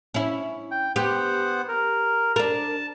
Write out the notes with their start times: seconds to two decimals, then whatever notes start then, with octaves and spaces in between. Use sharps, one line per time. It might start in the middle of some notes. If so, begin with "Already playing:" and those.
0.14 C#4 E4
0.71 G5
0.96 B3 G4 C5 F#5
1.68 A#4
2.36 D4 A#4 A5